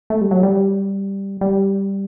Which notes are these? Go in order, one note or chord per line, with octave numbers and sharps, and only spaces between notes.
A3
G3
F#3
G3
G3